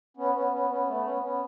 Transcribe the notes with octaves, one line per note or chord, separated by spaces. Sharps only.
B3 C#4
B3 C#4
B3 C#4
B3 C#4
A3 B3
B3 C#4
B3 C#4